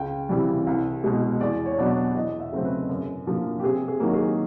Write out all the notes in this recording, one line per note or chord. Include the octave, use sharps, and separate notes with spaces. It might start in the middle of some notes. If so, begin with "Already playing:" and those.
Already playing: C#2 G5
C3 E3 G3
C2
B2 G#3
E2 D5
C#5
B2 F#3 B3 D4
D5
E2 D#5
E5
C#3 F#3 A3 C4
B4
F#2
D3 F3 A#3
G4
C3 G#4
G#4
D#3 F#3 A#3
G#4